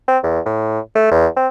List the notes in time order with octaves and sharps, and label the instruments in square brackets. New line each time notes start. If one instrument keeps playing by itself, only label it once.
[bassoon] C4
E2
A2
A3
E2
C4